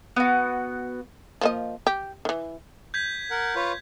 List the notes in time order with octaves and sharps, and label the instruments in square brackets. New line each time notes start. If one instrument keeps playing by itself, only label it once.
[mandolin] B3 F#4
[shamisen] F3 A#3 D#5
G4
D#3 E3
[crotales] G6 G#6 B6
[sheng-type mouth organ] A#4 F#5
F4 B4 C#5